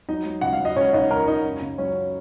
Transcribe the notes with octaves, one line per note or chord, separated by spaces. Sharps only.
F#3 D#4 D#5
F#3
C#2 F#5
F5
F#3
D#5
C#2 C#4 C#5
C#2 D#4 D#5
C#2 A#4 A#5
C#2 D#4 D#5
F#2
C#3
F#3 C#4 C#5